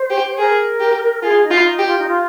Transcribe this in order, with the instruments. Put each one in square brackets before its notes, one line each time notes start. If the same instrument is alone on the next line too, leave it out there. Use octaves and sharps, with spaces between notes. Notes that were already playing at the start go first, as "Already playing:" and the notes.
Already playing: [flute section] C5
[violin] G4
[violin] G#4 [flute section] A#4
[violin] G4
[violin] F4 [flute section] G#4
[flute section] D#4
[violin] F4
[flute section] D#4
[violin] G4
[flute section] F4
D#4
F4